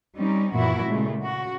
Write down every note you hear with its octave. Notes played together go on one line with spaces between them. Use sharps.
G3 C4 C#4 D#4
F#2 A#2 E3 B3 E4 F#4
A#2 C#3 G#3 A3
C#3 F#4